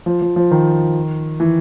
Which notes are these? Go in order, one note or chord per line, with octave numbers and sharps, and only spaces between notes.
F3
F3
F3
D#3
E3